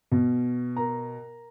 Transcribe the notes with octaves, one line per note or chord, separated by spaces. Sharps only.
B2
A#4 A#5